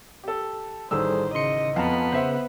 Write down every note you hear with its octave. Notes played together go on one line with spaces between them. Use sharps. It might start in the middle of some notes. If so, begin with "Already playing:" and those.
G4 A4
A1 D#3 G3 G#4 A4 C5 E6
C#3 D#5 C6 C#7
F2 B3 F5 A5 A#5
C#3 C5 E5 F#5